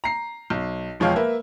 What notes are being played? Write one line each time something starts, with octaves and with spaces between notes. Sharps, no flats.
A#5 C7
B1
E1 F3 G#3 C#5 F5 G5
A#3 B4 E5